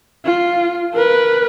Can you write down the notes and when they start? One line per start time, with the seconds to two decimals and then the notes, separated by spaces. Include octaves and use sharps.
0.25 F4
0.94 A#4 B4